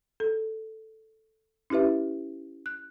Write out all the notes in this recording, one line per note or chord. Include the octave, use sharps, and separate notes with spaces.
A4
C#4 E4 G4 B4 E5
F#6